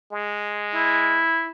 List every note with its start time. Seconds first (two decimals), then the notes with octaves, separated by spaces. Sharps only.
0.12 G#3
0.75 E4